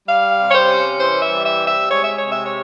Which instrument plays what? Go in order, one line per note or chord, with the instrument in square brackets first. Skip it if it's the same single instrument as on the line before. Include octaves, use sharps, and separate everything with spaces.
[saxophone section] G3 F5
C3
C#5
C5
C#4
E3 C5
E5
G3
E5
C3
E5
G#3 C#5
E5
C3 C#5
E5
C#5